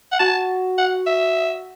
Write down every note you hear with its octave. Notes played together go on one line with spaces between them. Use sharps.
F#5
F#4 A5
F#5
E5